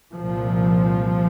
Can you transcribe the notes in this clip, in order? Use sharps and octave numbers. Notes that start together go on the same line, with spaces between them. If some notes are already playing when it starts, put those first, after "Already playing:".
C2 A#2 F3